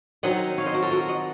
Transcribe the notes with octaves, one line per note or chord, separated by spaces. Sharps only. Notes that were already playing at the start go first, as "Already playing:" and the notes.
D#3 F#3 C4 D#4 D#5 F#5
C#5 F5
C5 D#5
F#4 A#4
F4 A4
F#4 A#4
D#5 F#5